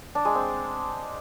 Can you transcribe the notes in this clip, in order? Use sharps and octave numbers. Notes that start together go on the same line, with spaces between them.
D4
G#3
C4